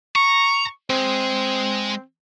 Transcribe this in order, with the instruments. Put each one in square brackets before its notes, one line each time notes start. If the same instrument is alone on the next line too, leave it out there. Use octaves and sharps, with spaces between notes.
[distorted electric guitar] A#5 [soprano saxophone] C#6
[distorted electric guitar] G#3 [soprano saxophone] C4